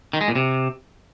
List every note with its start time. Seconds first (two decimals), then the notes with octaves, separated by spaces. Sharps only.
0.13 D#3
0.21 G#3
0.28 A#2
0.35 C3